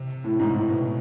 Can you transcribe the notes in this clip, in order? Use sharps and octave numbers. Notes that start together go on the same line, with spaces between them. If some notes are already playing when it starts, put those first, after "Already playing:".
Already playing: C3
A2
G#2
A2
B2